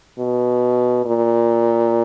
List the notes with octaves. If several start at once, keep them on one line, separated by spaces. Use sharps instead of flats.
B2
A#2